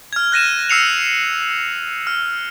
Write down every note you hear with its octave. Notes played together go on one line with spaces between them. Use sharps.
F6 G#6
F#6 A#6 D#7 E7
E6 F6 C7 C#7 E7 F7
F6